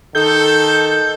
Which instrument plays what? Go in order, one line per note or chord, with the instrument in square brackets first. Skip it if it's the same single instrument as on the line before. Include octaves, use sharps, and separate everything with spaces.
[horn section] D#3 D#4 A4 [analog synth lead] G6